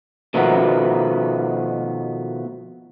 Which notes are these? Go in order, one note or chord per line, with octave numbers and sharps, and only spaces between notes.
B2 D#3 F3 A3 B3